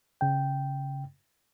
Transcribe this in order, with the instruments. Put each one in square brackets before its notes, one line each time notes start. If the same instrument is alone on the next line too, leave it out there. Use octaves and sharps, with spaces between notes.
[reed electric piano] C#3 G5